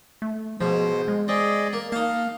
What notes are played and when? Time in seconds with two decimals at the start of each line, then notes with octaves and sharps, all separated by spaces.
0.22 A3
0.61 G#2 B2 F3 C5
1.08 G#3
1.28 C4 G#4 D5 D#5
1.73 A#3
1.92 A#3 D#4 F5 A5